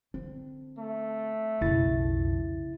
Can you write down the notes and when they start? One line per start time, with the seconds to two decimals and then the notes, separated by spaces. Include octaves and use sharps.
0.14 D3 C4
0.78 A3
1.61 B1 F2 C#3 E4 A6